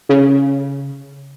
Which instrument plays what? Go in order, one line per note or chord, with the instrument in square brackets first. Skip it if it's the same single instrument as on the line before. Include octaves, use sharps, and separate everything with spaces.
[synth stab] C#3